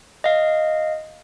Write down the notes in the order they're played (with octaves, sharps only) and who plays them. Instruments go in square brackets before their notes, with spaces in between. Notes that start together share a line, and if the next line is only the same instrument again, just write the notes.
[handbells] D#5 F5